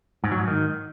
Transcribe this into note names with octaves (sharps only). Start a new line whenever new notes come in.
G#2
F#3
G#2
D#3